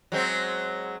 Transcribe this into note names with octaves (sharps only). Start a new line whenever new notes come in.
F#3 G#3 C4